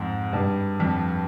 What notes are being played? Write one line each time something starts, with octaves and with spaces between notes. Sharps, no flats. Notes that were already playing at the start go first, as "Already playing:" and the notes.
Already playing: F2 G#2
G2
F2